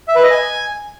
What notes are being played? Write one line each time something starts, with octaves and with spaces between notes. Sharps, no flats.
E5
B4
D#5
G#5